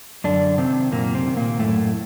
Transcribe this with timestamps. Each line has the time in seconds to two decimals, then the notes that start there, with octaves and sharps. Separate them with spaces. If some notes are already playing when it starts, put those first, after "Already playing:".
0.24 F#2 D3 D4
0.58 C3 D#3 C4
0.92 F#2 A#2 A#3
1.14 C3 C4
1.27 D#3
1.37 A#2 A#3
1.59 F#2 A2 A3